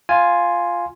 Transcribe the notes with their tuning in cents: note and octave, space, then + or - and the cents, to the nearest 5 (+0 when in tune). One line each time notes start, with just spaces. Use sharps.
F4 +0 G#5 +0